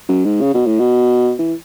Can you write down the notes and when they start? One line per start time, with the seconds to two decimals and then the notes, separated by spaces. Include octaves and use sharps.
0.09 F#2
0.25 G#2
0.41 C#3
0.54 B2
0.66 A2
0.80 B2
1.39 E3